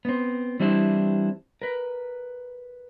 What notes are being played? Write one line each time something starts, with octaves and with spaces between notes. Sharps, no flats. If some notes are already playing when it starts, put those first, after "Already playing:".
B3 C4
E3 G3 C4 D4 E4
A#4 B4